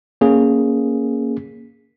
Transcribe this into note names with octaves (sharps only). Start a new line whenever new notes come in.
A#3 C#4 G#4